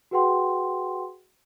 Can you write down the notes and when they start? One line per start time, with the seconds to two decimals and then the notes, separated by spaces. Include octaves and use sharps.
0.11 F#4 G#4 B4 F#5 G5 C6